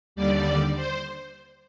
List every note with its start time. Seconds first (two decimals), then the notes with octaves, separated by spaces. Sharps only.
0.16 D#2 D3 G3 D5
0.76 C5